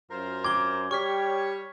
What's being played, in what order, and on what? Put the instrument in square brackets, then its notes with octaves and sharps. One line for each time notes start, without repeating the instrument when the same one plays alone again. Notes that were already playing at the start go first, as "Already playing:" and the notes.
[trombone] F#2 [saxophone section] F4 A#4 C5
[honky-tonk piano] D6 [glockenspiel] G#6 G7
[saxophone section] G3 C#5 [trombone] G4 [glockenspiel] C#6 F6 B6